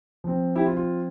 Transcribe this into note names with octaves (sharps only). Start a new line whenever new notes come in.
F3 C4
E4 G4
F4
F4